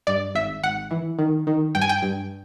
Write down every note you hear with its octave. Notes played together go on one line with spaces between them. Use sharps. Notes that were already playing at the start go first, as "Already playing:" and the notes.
G2 D5
G#1 E5
G#1 F#5
E3
D#3
D#3
G2 G5
G#5
G5
G2